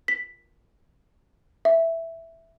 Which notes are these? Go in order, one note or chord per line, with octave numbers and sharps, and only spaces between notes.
B6
E5